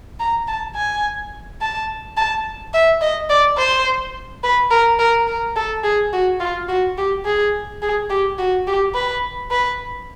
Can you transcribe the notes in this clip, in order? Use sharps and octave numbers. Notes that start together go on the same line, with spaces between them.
A#5
A5
G#5
A5
A5
E5
D#5
D5
C5
B4
A#4
A#4
A#4
A4
G#4
F#4
F4
F#4
G4
G#4
G#4
G4
F#4
G4
B4
B4